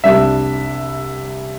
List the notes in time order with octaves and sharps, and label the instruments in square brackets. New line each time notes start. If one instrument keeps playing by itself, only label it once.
[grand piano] C2 C3 G3 D4 [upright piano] E5